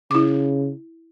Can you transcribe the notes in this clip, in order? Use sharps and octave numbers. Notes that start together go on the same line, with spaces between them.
C#3 E4 D6